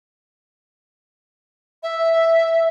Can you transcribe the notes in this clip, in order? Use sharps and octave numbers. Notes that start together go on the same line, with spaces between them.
E5